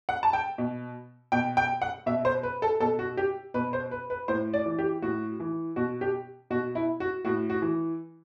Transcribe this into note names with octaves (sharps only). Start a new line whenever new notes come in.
F#5
A5
G5
B2
B2 G5
G5
F#5
B2 E5
C5
B4
A4
B2 A4
F#4
G4
B2 B4
C5
B4
B4
A2 C5
D5
E3
G4
A2 F#4
E3
B2 F#4
G4
B2 F#4
E4
F#4
A2 F#4
F#4
E3